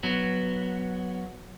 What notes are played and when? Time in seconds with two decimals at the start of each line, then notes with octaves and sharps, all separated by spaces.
0.03 F#3 B3